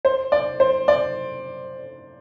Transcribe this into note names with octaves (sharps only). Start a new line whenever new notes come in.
C5
D5
C5
D5